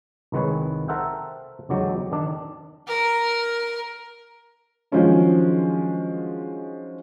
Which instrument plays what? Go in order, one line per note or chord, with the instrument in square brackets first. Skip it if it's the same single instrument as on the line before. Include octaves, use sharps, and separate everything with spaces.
[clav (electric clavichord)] C2 D#3 G#3 B4 C#5
A4 A#4 C5 E5 F#5 G5
E2 D3 F#3 G#3 G4
D#3 D4
[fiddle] A#4
[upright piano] D#3 F3 F#3 G#3 C#4 D4